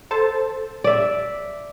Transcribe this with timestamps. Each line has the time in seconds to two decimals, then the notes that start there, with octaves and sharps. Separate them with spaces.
0.11 A4 C5 A5
0.84 D5 E5